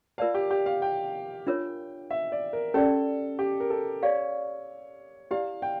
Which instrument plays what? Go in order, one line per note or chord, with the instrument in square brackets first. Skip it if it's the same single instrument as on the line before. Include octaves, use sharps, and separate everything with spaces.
[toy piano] F4 A#4 D5 A5 [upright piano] F5
[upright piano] G4
G4
F5
G5
[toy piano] D4 F4 A#4 C#5
[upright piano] E5
D5
A#4
[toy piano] C#4 G4 D5 [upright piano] A4
[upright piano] G4
A#4
A4
[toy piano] G4 D5 F5 [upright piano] C#5
[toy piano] E4 G4 D5 [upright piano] F5
[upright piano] G5